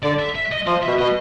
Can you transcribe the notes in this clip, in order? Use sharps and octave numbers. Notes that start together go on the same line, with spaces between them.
D3 D5
E5
E5
D#5
F3 D#5
E5
B2
B2 D#5